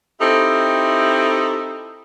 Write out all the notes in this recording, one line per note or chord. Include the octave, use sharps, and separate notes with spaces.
C4 D#4 E4 G4 A4